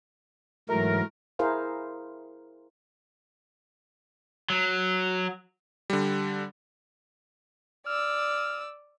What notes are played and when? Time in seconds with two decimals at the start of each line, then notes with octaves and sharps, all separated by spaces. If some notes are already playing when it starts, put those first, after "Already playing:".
0.69 G#2 E3 F#3 A3 A#4
1.39 E4 G#4 A#4 C5 F5
4.50 F#3
5.90 D3 G3
7.87 D5 E6 F6